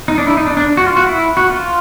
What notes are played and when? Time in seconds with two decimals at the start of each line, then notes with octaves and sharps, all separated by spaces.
0.08 D#4
0.18 D4
0.27 E4
0.37 D#4
0.46 D4
0.57 D4
0.77 F#4
0.86 F4
0.97 F#4
1.06 E4
1.37 F#4
1.50 F4